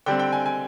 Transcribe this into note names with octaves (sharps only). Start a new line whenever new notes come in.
D3 G3 C4 G5
G5
G#5
G#5